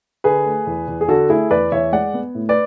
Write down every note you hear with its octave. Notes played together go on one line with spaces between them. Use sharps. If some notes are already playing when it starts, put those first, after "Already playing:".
D3 G#4 B4
A3
E2
E2
G#4
D3 F#4 A4
A3 E4 G#4
E2 B4 D5
E2 C#5 E5
G#3 D5 F#5
B3
A2
B4 D5